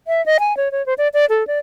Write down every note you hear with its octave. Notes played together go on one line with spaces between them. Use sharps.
E5
D#5
G#5
C#5
C#5
C5
D5
D5
A4
D5